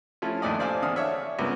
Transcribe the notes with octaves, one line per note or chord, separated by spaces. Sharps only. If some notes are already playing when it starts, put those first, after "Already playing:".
F3 A3 C#4 E4 F4
A#1 D#2 A3 D5 D#5
C5 D5 E5 F5 G#5 A5
E2 D3 D#6 F6
D4 C#5 E5
C#2 G2 A#3 B3